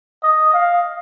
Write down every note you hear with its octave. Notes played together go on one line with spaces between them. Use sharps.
D#5
F5